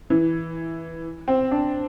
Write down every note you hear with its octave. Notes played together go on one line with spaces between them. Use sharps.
E3
C4
D4